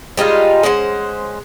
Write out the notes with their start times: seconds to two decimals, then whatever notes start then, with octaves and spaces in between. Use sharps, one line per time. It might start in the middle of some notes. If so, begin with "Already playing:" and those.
0.17 G3 G#3 D#4 F4
0.63 G#3 C#4 C5 F#5